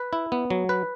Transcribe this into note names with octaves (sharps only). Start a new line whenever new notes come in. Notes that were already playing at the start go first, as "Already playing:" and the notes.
Already playing: B4
E4
B3
F#3
B4